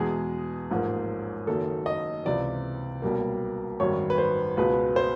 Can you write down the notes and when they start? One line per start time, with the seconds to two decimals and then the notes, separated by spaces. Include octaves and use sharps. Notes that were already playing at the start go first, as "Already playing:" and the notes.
Already playing: E2 B2 G#3 G#4
0.71 A1 G#2 F3 A#3
1.47 F#1 F#2 D#3 A4
1.86 D#5
2.25 C#2 C3 E3 D5
3.02 B1 B2 G3 A#3
3.80 G#1 F#2 D#3 G3 C#5
4.10 B4
4.18 C5
4.57 C#2 B2 G#3 B4
4.96 C5